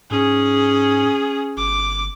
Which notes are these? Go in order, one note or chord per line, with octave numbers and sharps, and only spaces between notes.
G#2 C#4 G#4
G1 D6